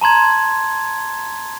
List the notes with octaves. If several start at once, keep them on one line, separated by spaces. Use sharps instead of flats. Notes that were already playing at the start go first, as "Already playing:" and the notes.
A5 A#5 C6 G#6